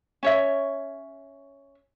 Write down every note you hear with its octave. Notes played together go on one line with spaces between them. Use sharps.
C#4 C#5 E5